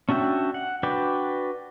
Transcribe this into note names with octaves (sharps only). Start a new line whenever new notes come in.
C#4 D4 F#4 E5 G5
F#5
D4 F#4 B4 D5 G5